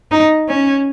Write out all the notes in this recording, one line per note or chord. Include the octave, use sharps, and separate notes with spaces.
D#4
C#4